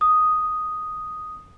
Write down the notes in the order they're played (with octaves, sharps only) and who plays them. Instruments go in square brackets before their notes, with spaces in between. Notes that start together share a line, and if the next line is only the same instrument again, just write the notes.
[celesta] D#6